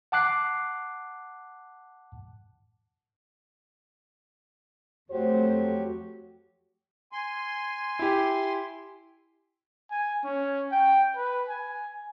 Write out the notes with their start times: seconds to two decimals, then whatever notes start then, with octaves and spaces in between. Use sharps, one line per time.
0.12 F#5 A5 D6 F#6 C7
5.10 F2 F#3 A3 F#4 G4 C5
7.12 G#5 C6
7.99 E4 G4
9.91 G#5
10.24 C#4
10.72 G5
11.16 B4
11.49 G#5